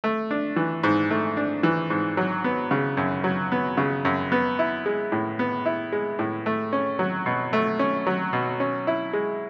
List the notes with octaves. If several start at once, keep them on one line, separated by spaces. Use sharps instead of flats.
A3
D4
E3
G#2
A3
D4
E3
G#2
F#3
B3
C#3
F#2
F#3
B3
C#3
F#2
B3
E4
G#3
A2
B3
E4
G#3
A2
A3
C#4
F#3
B2
A3
C#4
F#3
B2
C#4
E4
G#3